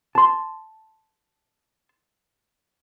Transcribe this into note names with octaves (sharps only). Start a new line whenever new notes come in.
A5 C6